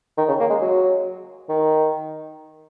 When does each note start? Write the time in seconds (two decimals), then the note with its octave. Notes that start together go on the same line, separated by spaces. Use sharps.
0.18 D#3
0.28 C#3
0.40 A#3
0.50 G#3
0.61 F#3
1.49 D#3